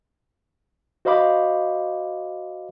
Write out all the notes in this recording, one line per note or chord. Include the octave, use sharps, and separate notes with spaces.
F#4 C5 D#5 F5 B5 D6